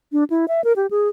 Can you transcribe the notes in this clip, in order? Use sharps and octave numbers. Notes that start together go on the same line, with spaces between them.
D4
E4
E5
A#4
G4
G#4